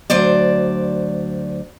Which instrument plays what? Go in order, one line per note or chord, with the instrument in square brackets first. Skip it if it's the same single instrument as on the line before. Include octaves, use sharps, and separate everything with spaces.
[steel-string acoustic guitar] D2 F#3 C5 D5